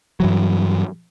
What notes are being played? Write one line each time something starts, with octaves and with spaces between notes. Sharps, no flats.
G2 E3 F#3